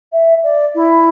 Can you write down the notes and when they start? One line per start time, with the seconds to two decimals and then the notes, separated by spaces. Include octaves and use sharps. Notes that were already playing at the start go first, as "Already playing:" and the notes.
0.12 E5
0.43 D5
0.75 E4